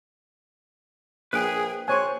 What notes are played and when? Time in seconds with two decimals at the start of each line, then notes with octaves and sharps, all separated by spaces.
1.33 A#1 G#4 B4 G5
1.88 A#1 C5 C#5 G#5 F#6